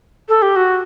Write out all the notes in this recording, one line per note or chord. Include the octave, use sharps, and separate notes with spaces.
A4
G4
F#4